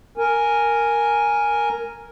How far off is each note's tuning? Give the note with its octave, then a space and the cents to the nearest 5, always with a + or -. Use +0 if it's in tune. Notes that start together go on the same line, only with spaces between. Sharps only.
A#4 +0 G#5 +0